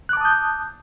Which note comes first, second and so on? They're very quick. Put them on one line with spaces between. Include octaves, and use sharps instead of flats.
F#6 D6 A5 D#6 G6